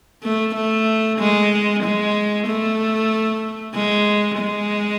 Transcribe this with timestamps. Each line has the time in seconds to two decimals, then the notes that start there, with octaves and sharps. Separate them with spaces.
0.23 A3
0.55 A3
1.19 G#3
1.83 G#3
2.47 A3
3.74 G#3
4.38 G#3